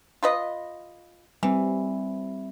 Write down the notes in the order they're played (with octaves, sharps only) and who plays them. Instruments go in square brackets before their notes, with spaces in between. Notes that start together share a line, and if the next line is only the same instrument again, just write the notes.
[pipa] F4 B4 D#5
[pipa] E3 [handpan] G3 C4